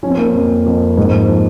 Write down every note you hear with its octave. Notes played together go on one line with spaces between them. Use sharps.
F3 C#4
C4
A#3 C#4
F2
F2
G#2
F3